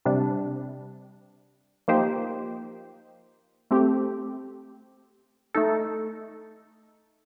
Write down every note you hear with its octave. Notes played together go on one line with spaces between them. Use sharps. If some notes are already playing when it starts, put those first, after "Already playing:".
C3 G3 D4
F3 A#3 D#4 G4 C5
A3 C4 G4
A3 D#4 A4